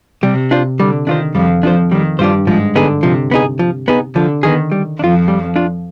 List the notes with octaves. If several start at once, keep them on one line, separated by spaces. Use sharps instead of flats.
C3 G3
D4 F4 C5
D3 G3
D#3 D4 F4 C5
F2 F3 G3
F2 F3 D4 F4 C5
D#3 G3
G2 G3 D4 F4 C5
G#2 F3 G#3
D3 B3 D#4 G#4
C3 F3
B3 D#4 G#4
F3
B3 D#4 G#4
D3 F3
D#3 B3 D#4 G#4
G3
F2 F3 D4 F4
G3
D4 F4